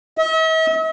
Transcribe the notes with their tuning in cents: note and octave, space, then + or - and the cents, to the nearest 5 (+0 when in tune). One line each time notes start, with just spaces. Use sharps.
E5 -45